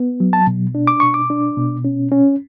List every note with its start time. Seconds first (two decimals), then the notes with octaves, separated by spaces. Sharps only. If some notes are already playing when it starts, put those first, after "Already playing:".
Already playing: B3
0.20 F#3
0.33 A5
0.47 B2
0.75 D4
0.87 D6
1.00 B2 C#6
1.14 D6
1.30 D4
1.57 B2
1.85 C#4
2.12 C#4